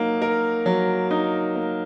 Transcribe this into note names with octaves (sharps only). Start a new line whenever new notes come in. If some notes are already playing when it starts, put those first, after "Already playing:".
Already playing: F#3 A#3 D#4
A#4
F#3
D#4
A#3